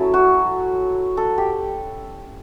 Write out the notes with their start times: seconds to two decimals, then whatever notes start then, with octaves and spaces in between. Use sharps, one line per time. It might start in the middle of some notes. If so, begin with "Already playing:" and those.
Already playing: F#3 C#4 E4 A4
0.14 F#4
1.17 A4
1.38 G4